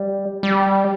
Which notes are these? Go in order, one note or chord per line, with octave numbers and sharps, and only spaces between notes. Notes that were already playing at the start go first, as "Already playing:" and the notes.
Already playing: G3
G3